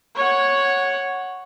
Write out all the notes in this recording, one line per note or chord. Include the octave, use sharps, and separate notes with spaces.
C#5 F#5